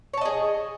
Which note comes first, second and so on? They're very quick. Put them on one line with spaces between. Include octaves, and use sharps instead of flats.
C#5 A5 D#5 G#4